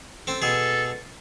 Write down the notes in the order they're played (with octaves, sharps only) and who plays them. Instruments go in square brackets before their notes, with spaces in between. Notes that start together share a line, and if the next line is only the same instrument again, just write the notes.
[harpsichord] C4 A4
[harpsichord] B2 G#4 [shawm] A4